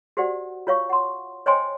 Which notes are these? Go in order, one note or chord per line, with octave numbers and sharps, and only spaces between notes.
F#4 G4 C5 D5 F#5
F4 C#5 F5 C#6
F#5 C6
C5 C#5 D#5 G5 G#5 C6